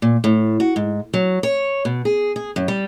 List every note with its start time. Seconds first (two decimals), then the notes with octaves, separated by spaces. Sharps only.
0.02 A#2
0.24 A2
0.60 F#4
0.76 G#2
1.14 F#3
1.43 C#5
1.85 B2
2.05 G#4
2.36 G#4
2.56 F#2
2.68 G3